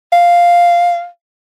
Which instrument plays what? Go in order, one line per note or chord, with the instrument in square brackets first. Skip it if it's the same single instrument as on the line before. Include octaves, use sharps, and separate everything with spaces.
[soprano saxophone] F5